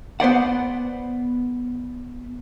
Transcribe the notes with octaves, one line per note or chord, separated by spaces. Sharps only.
B3 C5 D5 F#5